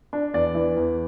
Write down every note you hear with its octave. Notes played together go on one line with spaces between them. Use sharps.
D4
E2 D5
E3
E2